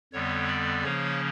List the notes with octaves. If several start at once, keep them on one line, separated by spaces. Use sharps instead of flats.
F2 D3 G3 B3 C#5
D5
C#3 F3 A#3 C#4 C#5